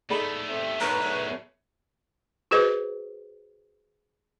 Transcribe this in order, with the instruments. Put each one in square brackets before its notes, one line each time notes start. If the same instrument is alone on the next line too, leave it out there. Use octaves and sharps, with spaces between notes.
[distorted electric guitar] A3 B3 [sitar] D#4 A4 [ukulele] G#4 D5 B5
[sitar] C3
[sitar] B2 C#4 [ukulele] D#4 A#4 A#5 [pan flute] B4
[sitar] F#2 C#3 D4
[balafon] F#4 G#4 B4 C5 D#5